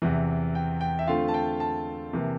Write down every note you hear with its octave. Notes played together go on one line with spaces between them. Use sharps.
E2 C3 E3
G5
G5
E5
D3 A3 C4 F4 F5
A5
G5
A5
C3 E3 A#3